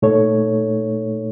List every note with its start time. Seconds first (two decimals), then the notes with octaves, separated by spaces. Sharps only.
0.02 A#2 A3 D#4 A4 C#5